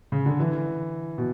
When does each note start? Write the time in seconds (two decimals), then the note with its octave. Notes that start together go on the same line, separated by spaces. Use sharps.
0.12 C#3
0.26 D3
0.39 E3
1.18 B2